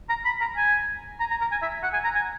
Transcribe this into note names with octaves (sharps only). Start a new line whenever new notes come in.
A#5
B5
A#5
G#5
A#5
A#5
A#5
G#5
E5
F#5
G#5
A#5
G#5